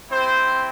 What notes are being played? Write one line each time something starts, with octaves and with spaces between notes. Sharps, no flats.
C4 E4 G4 C5